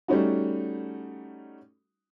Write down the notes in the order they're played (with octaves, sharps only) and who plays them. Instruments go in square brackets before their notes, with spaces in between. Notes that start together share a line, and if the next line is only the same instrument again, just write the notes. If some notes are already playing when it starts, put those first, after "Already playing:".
[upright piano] G3 A3 C#4 D#4 F#4